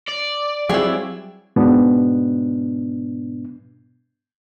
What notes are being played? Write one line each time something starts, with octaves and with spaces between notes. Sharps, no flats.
D5
F#3 G3 C4 E4 F4 G#4
G#2 B2 B3 D4